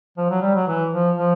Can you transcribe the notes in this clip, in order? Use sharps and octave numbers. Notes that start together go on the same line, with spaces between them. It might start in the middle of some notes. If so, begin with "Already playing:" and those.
F3
F#3
G3
F#3
E3
F3
F3